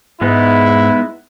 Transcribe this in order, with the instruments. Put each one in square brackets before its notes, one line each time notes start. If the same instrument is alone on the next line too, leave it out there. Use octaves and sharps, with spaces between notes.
[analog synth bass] G#2 [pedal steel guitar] G#3 B3 D#4 [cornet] E4